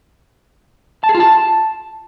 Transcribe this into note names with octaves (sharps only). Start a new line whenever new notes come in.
A5
G#4
F4
A5